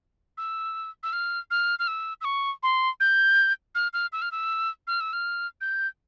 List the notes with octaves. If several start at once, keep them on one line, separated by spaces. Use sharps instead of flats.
E6
E6
F6
F6
F6
E6
E6
C#6
C6
G6
F6
F6
E6
F6
E6
F6
E6
F6
G6